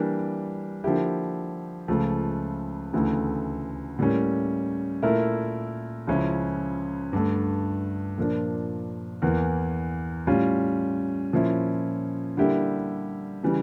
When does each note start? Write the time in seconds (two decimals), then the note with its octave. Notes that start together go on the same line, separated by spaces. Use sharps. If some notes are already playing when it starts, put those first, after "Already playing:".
Already playing: E3 G3 A#3 D4 G4
0.84 D3 F3 A#3 E4 G4
1.88 C#2 C#3 F3 A3
2.93 D2 C#3 E3 A3
3.99 A2 G3 A#3 C#4
5.02 A#2 A3 E4 A#4
6.07 C#2 C#3 F3 C#4 E4
7.13 G2 D3 A3
8.18 A#2 F3 A#3 D4
9.22 E2 E3 A#3
10.27 A2 G3 C#4 F4
11.33 A#2 F3 C#4 E4
12.37 D3 G3 A#3 E4 G4
13.43 C#3 E3 G3